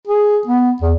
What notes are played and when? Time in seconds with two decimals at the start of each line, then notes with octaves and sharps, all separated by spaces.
0.08 G#4
0.48 B3
0.82 E2